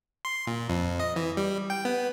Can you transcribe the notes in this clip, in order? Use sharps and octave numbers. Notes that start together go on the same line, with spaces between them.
C6
A#2
F2
D#5
E3
G3
G5
B3